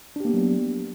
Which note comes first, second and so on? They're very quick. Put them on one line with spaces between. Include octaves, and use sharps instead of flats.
D4 G4 A#3 B3 F#3